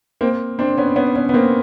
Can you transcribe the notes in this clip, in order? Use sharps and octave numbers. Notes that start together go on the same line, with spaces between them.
A#3 C4
C4 D4
B3 C#4
B3 C#4
B3 C#4
B3
A#3 C4